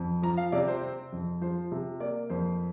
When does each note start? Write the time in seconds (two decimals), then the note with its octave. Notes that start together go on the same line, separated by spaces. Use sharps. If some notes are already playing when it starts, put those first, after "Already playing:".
Already playing: F2
0.22 F3 A#5
0.37 F5
0.52 C3 D5
0.67 C5
0.82 C4
1.12 F2
1.41 F3 C5
1.72 C3
2.00 A#3 D5
2.30 F2 C5